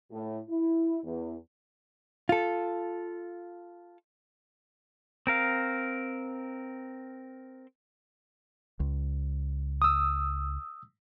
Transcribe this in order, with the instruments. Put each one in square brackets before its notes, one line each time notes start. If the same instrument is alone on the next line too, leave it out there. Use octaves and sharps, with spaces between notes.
[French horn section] A2
E4
E2
[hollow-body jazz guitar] F4 A4
[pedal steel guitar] C4 A#4 F5
[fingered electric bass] C#2
[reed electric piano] D#6 E6